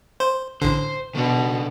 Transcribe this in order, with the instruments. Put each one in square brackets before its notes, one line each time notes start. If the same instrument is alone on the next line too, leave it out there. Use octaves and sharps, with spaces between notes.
[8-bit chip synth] C5
[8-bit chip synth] A1 D3 [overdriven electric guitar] C5
[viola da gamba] B2 [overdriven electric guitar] D#3 D4